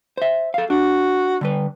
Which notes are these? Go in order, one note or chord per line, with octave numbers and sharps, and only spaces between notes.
C5 E5
A4 F5
D4 F#4
D3 G3 B4